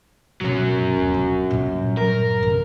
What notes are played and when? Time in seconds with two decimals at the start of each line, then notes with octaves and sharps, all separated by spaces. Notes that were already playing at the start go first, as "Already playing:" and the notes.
0.41 G2 B2 F#3 C#4
0.96 D#1 B3
1.14 D4
1.50 G2 A#2
1.97 A#4
2.43 D3 C#4